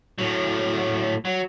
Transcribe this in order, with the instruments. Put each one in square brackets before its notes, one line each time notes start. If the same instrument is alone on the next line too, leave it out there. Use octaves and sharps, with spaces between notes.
[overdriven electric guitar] A2 F#3
F#3